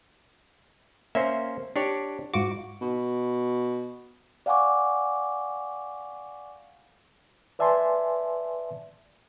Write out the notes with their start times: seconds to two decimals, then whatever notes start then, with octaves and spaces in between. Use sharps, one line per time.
1.15 A#3 C#4 C5 E5
1.76 D4 G4 C#5
2.34 G#2 F4 F#4 D6
2.82 B2
4.46 D5 F5 F#5 G#5 C#6 D6
7.59 B4 D5 E5 G#5 A5 C6